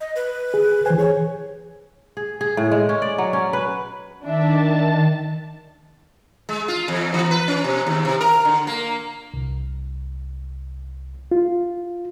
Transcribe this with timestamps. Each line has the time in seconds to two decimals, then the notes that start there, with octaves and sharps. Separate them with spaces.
0.01 D#5
0.16 B4
0.54 G#4
0.86 E3 C5 G#5
0.98 G#4 C#5
2.17 G#4
2.41 G#4
2.57 A2
2.72 G#3
2.89 C#4
3.02 D5
3.18 F#3
3.33 C#4
3.53 B4
4.24 D#3 D4 E5 A5
6.49 G#3
6.68 F4
6.88 E2
7.14 E3
7.31 B4
7.48 C#4
7.64 B2
7.87 D#2
8.05 C3
8.21 A#4
8.45 D3
8.67 A#3
9.34 C2
11.31 F4